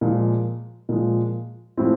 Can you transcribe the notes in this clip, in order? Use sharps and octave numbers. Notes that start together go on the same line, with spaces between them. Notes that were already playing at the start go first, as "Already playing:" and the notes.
A#2 F3 G#3
A#2 F3 G#3
A2 F3 G#3 C4 E4